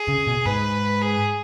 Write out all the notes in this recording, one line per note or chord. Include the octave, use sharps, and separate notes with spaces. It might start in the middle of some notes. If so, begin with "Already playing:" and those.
Already playing: G#4
C#3
B2
G#2 B4
G#4